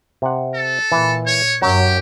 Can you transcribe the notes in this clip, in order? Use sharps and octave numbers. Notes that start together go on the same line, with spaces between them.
C3 F#5
A4
A#2 E3
C#5
F#2 F#3 G4